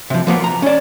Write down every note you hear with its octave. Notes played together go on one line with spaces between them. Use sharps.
C3 F3
F3 A#3 B3
A#5
C#4 D5